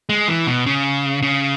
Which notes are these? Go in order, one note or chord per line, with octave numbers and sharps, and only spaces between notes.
G#3
E3
B2
C#3
C#3